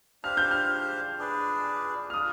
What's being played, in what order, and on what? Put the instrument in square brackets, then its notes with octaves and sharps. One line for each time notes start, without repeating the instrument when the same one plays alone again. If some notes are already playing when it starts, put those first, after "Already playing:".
[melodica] D4 G4 C5 F5 [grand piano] F6
[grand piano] G6
F6
[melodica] D4 G#4 B4 D5
[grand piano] F6
[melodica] G3 D4 F4 [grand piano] D#6